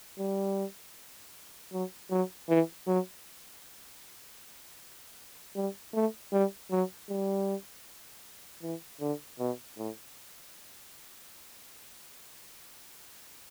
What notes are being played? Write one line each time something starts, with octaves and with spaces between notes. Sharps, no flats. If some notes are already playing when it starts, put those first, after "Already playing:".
G3
F#3
F#3
E3
F#3
G3
A3
G3
F#3
G3
E3
D3
B2
A2